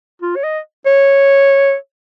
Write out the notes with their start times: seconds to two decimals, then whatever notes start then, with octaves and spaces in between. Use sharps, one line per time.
0.22 F4
0.36 C#5
0.44 D#5
0.86 C#5